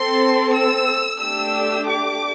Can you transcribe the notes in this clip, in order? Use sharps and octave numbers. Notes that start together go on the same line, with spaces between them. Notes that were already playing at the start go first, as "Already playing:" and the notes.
Already playing: C4 A4 C6
E6
A3 D4 G4 E6
D6